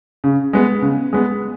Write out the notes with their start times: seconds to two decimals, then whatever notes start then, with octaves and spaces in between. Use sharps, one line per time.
0.24 C#3
0.53 G#3 B3
0.82 C#3
1.13 G#3 B3